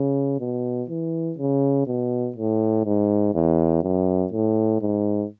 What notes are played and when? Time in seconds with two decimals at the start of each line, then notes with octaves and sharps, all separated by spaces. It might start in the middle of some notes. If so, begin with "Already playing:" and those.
Already playing: C#3
0.40 B2
0.89 E3
1.38 C#3
1.87 B2
2.36 A2
2.85 G#2
3.34 E2
3.83 F#2
4.33 A2
4.81 G#2